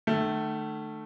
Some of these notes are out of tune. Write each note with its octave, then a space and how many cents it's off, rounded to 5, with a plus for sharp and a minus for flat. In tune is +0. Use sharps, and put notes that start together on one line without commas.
D#3 -40 A3 +0